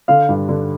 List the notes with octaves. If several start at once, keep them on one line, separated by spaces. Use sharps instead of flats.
D3 F5
G2
D3